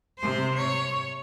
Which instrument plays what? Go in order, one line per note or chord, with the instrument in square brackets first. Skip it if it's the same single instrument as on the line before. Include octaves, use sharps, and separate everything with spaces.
[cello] C3 C5
C#5